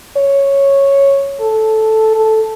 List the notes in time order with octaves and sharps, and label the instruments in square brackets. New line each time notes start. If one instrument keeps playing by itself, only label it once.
[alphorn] C#5
A4
A4